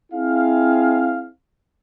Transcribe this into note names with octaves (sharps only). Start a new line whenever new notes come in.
C4 E4 G#4 F5